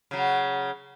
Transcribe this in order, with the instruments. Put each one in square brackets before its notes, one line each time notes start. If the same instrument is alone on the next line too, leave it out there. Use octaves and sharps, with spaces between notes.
[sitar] C#3 F#3